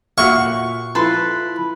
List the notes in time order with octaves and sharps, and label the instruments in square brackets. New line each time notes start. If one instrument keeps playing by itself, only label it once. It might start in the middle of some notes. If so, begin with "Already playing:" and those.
[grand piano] A#2 F#6 C#7 [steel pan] F#4 E5 F5 [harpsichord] C#6
[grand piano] F3 E4 [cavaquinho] A4 B4 C6